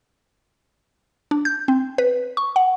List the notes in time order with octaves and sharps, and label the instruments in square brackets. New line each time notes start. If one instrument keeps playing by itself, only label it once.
[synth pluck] D4
G6
C4
B4
C#6
F#5